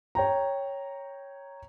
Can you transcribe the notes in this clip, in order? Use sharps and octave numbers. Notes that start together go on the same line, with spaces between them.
C#5 G5 A#5